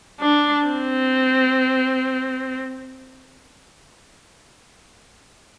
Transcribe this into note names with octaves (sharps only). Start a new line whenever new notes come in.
D4
C4